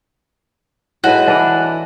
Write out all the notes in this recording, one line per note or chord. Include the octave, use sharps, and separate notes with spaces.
A2 G#3 F#4 B4
E3 D4